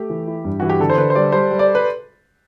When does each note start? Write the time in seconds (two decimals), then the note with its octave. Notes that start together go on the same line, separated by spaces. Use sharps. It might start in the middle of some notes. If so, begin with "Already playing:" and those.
Already playing: A3 G4
0.10 E3
0.27 E4
0.44 G2
0.60 E3 F#4
0.70 G4
0.80 D3 A4
0.90 C5
0.98 D3 B4
1.10 C5
1.15 G3 D5
1.32 G3 C5
1.51 G3
1.59 D5
1.75 B4